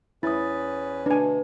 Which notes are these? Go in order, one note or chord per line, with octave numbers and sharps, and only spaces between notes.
E2 C#4 E4 B4 D#6 A6
D2 B2 D4 B4 G#5